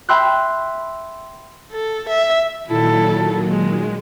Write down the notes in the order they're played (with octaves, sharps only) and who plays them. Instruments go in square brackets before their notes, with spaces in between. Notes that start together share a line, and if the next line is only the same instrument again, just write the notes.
[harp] E5 G5 B5 C6 E6 F#6
[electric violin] A4
E5
[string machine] A#2 D#3 F#3 [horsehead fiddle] E4 A4
[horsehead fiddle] G#3